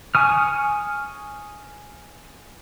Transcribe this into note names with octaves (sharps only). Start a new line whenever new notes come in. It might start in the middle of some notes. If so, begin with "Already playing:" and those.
G#5 C#6 D#6 F6